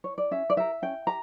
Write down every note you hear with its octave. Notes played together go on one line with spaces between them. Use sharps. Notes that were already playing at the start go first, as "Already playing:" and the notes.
C#5
D5
C#4 E5
D5
G4 A#4 E5
C#4 G5
G4 A#5